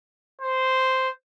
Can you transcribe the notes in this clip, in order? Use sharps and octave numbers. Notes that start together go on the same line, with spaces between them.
C5